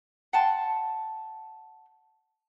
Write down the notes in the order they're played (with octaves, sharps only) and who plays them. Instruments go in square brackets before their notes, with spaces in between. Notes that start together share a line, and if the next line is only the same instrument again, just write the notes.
[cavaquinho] F#5 G5 A5 C6